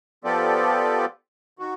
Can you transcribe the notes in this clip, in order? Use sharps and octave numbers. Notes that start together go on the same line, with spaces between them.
F3 B3 F4 G4 A4 D5
D#3 F#4